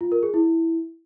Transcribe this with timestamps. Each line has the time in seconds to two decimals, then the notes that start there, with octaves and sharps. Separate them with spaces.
0.01 F4
0.12 A#4
0.23 G#4
0.34 E4